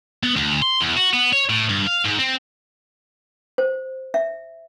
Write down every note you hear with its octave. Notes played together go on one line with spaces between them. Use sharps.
B3
D2
C6
E2
F#4
B3
C#5
A2
G2
F5
G#2
C4
C5
E5